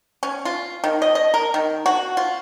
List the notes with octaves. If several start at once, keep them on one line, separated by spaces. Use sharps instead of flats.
C#4
F4
D#3
D#5
D#5
A#4
D#3
F#4
F4